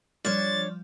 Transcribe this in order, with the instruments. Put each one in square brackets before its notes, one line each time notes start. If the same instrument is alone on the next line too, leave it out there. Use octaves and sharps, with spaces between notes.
[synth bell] F3 G3 [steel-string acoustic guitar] D4 C#5 [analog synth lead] A6